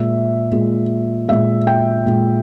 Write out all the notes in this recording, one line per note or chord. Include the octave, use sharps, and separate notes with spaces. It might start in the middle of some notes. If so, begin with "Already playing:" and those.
Already playing: A#2 G#3 E5
A#2 G#3
A#2 G#3 E5
G5
A#2 G#3